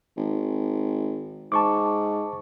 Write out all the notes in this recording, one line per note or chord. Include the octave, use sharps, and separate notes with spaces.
G#1
G#2 A5 C#6 D6